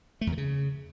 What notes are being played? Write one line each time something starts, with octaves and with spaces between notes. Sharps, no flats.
A3
E2
D#3
C#3